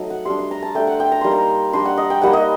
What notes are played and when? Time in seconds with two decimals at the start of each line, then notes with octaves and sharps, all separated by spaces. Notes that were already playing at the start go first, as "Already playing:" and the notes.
Already playing: F#3 A3 D#4 D#5
0.10 F#5
0.25 G3 D4 C6
0.38 C6
0.51 A#5
0.63 A5
0.75 A3 D4 G5
0.87 F#5
1.00 G5
1.12 A#5
1.21 G3 A#3 D#4 C6
1.31 A#5
1.73 G3 D4 C6
1.85 F#5
1.98 D#5
2.10 G5
2.22 G3 A#3 D#4 F#5
2.33 D#5